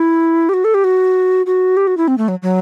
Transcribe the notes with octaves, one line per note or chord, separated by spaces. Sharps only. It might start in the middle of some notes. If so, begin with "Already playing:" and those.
Already playing: E4
G4
F#4
A4
G4
F#4
F#4
G4
F#4
E4
C4
A3
F#3
F#3